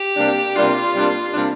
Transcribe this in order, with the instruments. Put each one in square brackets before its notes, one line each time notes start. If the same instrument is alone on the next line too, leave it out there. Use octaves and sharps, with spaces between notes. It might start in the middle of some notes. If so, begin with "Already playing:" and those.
Already playing: [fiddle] G4
[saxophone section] C3 G3 A#3 D4
[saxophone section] C3 G3 A#3 D4 [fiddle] F4
[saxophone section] C3 G3 A#3 D4
C3 G3 A#3 D4